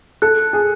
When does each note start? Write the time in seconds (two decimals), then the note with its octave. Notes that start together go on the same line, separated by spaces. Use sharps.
0.22 A4 F#6
0.53 G#4